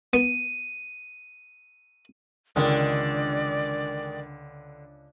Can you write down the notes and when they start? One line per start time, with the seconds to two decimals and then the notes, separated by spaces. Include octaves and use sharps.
0.13 B3 D#7
2.56 C#2 D3 D#3 G#3 D5